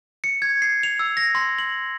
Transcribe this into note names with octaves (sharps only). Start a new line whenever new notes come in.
C#7
G#6
C7
F7
E6
A#6
C6
F#7